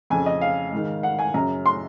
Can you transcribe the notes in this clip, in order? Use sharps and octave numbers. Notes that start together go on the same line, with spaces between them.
F2 C#3 G#5
D#5
F5
G#2 D#3
F#5
G#5
F#2 C#3 A#5
C6